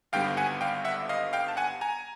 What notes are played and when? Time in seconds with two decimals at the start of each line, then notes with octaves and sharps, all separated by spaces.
0.12 G#1 G2 D3 G3 B3 F5 G5
0.37 F#5 G#5
0.61 F5 G5
0.85 E5 F#5
1.09 D#5 F5
1.33 F5 G5
1.48 A5
1.57 F#5 G#5
1.81 G#5 A#5